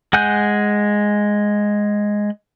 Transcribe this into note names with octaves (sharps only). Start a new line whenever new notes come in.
G#3 F#5 G#5 F#6 G6